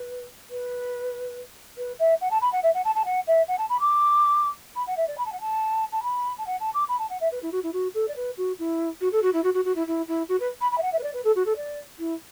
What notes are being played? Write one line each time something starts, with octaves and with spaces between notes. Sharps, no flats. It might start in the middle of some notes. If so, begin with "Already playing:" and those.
Already playing: B4
B4
B4
E5
F#5
A5
B5
F#5
E5
F#5
A5
A5
F#5
E5
F#5
A5
B5
D6
B5
F#5
E5
D5
B5
A5
F#5
A5
A5
B5
A5
F#5
A5
D6
B5
A5
F#5
E5
B4
E4
F#4
E4
F#4
A4
D5
B4
F#4
E4
F#4
A4
F#4
E4
F#4
F#4
F#4
E4
E4
E4
F#4
B4
B5
B5
E5
F#5
E5
B4
D5
B4
A4
F#4
A4
D5
E4